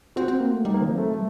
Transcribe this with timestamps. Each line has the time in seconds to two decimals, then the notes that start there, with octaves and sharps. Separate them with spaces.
0.16 C4 F#4
0.28 C4
0.40 A#3
0.53 A3
0.65 G3 D#4
0.74 A#3
0.81 D#3 C4
0.90 F#3
0.98 A3
1.14 G3 A3